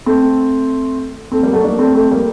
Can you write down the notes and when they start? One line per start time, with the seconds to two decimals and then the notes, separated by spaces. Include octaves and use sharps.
0.06 A3 C4
1.32 A3 C4
1.43 G3 A#3
1.53 F#3 A3
1.63 A#3 D4
1.79 A3 C4
1.95 A3 C4
2.11 G3 A#3